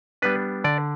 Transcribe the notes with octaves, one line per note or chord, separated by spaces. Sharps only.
G3 B3 D4 B4
D3 D5